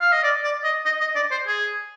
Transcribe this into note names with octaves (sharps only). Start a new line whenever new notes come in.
F5
D#5
D5
D5
D#5
D#5
D#5
D5
C5
G#4